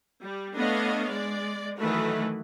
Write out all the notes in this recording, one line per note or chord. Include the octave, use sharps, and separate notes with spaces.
G3
A3 B3 D4 C#5 D#5 F5
G#3 D5
D#3 E3 F#3 A3 B4